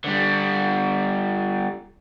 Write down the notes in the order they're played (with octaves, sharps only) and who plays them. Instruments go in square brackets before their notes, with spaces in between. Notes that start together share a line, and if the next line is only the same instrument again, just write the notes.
[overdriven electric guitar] D3 G3